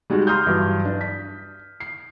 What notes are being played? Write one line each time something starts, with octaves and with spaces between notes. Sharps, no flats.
G3 G#3 D#4 F#4 G4
A#5 C6 D#6 F6 G6
G2 E3 F#3
D4
B6
C7